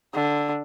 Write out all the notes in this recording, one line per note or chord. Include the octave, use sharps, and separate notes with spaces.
D3